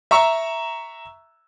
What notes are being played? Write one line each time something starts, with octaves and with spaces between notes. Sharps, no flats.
E5 A#5 C#6 E6